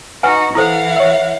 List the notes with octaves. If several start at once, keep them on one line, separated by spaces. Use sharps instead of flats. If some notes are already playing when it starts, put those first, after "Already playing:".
D#4 F#4 B4 F#5 G#5
E3 E4 A4 C5 F5 F#5
C#5 E5